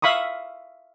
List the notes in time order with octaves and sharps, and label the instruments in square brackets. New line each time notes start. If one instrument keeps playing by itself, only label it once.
[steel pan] E5 F5 B5 C#6 D#6